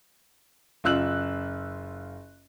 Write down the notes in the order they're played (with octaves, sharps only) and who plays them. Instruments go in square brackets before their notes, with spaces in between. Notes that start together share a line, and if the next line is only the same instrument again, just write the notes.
[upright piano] F#1 F4 E6 F#6 F#7